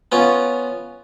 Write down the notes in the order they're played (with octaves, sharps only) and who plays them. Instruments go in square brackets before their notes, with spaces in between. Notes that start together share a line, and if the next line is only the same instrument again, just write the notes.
[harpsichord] B3 C#4 F4